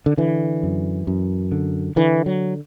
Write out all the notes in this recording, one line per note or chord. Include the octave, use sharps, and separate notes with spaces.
D3
D3 E3
F#2
F#2
D3
D3 E3
F#3